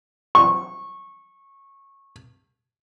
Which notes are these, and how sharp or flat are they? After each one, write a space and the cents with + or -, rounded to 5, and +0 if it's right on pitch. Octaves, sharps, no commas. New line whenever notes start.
C#6 -20